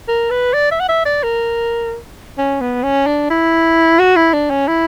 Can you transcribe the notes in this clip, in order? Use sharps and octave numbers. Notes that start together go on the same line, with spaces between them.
A#4
B4
D5
E5
F#5
E5
D5
A#4
C#4
B3
C#4
D4
E4
F#4
E4
D4
C#4
E4